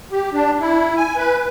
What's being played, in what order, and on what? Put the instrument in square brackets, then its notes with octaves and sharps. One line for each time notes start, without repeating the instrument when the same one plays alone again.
[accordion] G4
D4
E4
G#5
B4